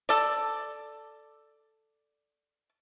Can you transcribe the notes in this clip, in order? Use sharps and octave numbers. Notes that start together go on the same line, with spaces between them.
A4 D5